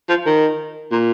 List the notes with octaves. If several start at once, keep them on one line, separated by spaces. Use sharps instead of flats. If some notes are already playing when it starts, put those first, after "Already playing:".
F3
D#3
A#2